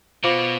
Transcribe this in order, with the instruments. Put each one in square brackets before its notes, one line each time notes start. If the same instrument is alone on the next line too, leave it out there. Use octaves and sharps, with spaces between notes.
[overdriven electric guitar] B2 [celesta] F4 C5 F5 B5 D6